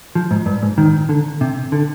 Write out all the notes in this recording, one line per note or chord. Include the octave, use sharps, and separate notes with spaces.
F3
G#2
G2
G#2
D#3
D3
C3
D3